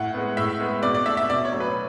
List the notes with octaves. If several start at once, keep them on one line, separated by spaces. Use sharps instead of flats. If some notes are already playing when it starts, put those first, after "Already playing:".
Already playing: A2 F#5
G#3 B3
A2 E5
G#3 B3
B2 D5
D5
A3 E5
E5
B2 D5
C#5
F#3 A3
B4